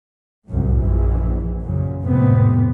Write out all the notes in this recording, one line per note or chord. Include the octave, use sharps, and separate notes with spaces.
C2 F#2 A2
A#1 E3
F#2 A#2 C#3
G#1 F2 A2 C3 B3